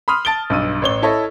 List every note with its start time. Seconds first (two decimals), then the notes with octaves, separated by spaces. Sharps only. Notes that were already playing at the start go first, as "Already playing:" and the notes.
0.08 B5 C6 D#6 F6
0.25 A5 A6 D7 G7
0.50 B1 G2 E6 D#7
0.82 A1 C#5 G7
1.03 E4 A4 C#5 D#5